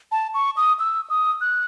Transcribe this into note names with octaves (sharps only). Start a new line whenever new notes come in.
A5
C#6
D#6
E6
D#6
F#6